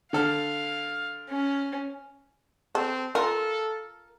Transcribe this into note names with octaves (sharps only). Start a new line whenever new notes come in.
D3 A4 F5 F6
C#4
C4 A4
F4 A4 A#4